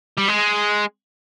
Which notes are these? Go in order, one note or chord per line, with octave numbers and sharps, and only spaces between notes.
G3
G#3